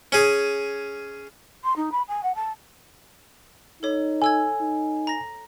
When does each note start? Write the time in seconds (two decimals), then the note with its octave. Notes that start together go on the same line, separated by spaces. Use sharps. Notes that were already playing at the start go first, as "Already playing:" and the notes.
0.12 C#4 G#4
1.64 C6
1.76 D#4
1.92 B5
2.08 G#5
2.23 F#5
2.35 A5
3.83 D#4 A4 C#5
4.22 A4 G#5 E6 G#6
4.61 D#4
5.07 A#5 A#6